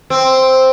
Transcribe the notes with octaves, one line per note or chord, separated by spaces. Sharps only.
C4